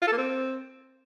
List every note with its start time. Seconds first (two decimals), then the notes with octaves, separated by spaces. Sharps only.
0.02 F4
0.07 A4
0.12 A#3
0.18 C4